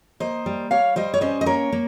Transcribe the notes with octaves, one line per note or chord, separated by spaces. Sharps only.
A#3 C5 D#5
G3
G3 C#5 F5
G3 C5 D#5
C#5
C#4 C5 D#5
D#5
A#3 A#4 C#5
A#3